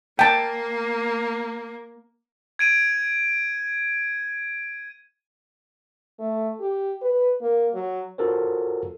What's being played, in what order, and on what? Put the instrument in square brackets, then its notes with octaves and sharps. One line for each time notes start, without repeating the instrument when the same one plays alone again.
[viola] A#3 [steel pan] G5 A5
[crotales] G#6 D7 D#7
[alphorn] A3
G4
B4
A#3
F#3
[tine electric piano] F4 F#4 A4 A#4 C5 C#5